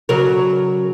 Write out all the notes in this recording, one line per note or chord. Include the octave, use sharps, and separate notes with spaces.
C#3 F#3 A#4